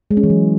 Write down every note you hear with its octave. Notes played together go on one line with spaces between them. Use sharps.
G#3
C#4
E3
F#3